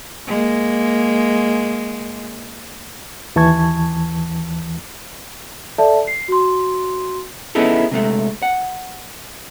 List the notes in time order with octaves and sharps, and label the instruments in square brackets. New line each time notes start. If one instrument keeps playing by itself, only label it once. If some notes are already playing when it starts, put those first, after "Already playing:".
[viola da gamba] G#3 A#3
[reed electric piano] D#2 E3 A5 C#6 G#6
[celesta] A4 D5 E5 A5
C7
F#4 C6
[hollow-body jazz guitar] B3 C#4 D#4 E4 G#4 A4
C3 G#3 A3
F#5